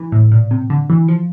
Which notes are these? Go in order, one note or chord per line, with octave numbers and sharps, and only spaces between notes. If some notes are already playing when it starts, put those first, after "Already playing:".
Already playing: E3
A2
A#2
C3
D3
E3
F3